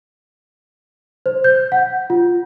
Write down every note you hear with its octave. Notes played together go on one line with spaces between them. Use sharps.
C5
G6
F#5
F4